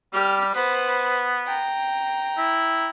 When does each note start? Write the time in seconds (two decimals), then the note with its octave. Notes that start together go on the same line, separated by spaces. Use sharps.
0.13 G3 G4 F6
0.54 B3 B4 C5
1.47 G5 A#5
2.38 E4